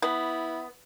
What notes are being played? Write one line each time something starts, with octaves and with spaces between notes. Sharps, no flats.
B3 E4